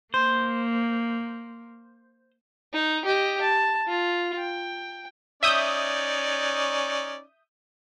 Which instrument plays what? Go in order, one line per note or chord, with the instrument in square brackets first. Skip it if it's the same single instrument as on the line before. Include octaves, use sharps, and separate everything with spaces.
[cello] A#3 [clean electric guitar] C5
[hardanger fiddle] D#4
G4 D#5
A5
F4
G5
[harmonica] C#4 D#4 D5 [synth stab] E5 D#6 G6